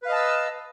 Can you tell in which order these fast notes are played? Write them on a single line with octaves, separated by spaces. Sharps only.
B4 F5 D#5 A5 E6